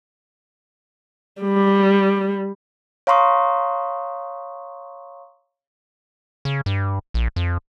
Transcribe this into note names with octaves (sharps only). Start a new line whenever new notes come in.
G3
C#5 F5 A#5 C6 C#6 D#6
C#3
G2
A#1
F2